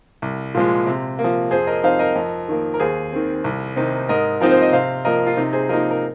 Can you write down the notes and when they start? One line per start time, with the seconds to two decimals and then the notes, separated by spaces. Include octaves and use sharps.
0.22 C2
0.55 A#2 F3 G#3
0.87 C3
1.19 A#3
1.24 F3
1.51 F2 G#4 C5
1.67 A#4 D#5
1.83 F3 C4 D#4 C5 F5
1.99 A#4 D#5
2.16 F2
2.48 D#3 A#3
2.74 A#4
2.80 D#2 G#4 C5
3.13 D#3 C4
3.44 C2
3.76 C3 D#3 C4 D#4
4.09 G#2 A#4 D#5
4.41 F3 C4 D#4 A#4
4.51 C5
4.62 D#5
4.72 C3 C5 F5
5.05 F3 A#3 A#4 D#5
5.27 F4
5.37 C3 D#4
5.53 G#4 C5
5.69 F3 A#3 D#4 A#4 D#5
5.91 A#4